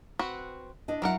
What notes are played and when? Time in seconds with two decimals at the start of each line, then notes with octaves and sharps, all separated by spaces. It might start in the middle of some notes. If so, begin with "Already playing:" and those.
0.19 C4 F#4 B4
0.88 D4 E4 D#5
1.02 D#3 F#3 E4 A#4 F#5